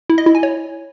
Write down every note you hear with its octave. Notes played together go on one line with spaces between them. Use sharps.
E4
D#5
E4
G#5
C#5